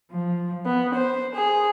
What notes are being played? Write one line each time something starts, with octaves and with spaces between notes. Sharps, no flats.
F3
B3
C5
G#4